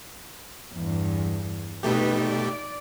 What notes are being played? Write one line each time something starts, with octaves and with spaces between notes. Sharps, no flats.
E2 G2
B2 A3 D#4 G4 B4
D5